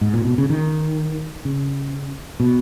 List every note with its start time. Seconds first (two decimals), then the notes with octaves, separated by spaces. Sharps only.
0.01 G#2
0.14 A#2
0.25 B2
0.38 C#3
0.50 D#3
1.45 C#3
2.40 B2